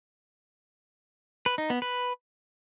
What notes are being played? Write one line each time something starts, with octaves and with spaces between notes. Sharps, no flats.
B4
D#4
B3
B4